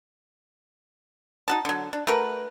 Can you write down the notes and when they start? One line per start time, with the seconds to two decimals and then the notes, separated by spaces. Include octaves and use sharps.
1.48 D#4 F#4 A5
1.65 D3 F#3
1.93 D4
2.07 A3 F#4 A#4 B4